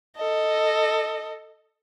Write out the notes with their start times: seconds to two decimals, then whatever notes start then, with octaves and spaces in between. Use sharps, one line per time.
0.16 A4 D#5